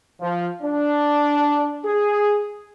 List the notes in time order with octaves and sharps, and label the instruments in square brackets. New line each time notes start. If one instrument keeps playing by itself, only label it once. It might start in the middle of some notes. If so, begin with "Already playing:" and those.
[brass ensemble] F3
D4
G#4